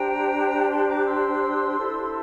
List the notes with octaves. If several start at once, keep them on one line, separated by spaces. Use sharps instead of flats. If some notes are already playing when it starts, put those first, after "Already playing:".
Already playing: D4 G4 C5 G5 A#5
A5 C6
A#5 D6
C6 E6
E4 A4 C5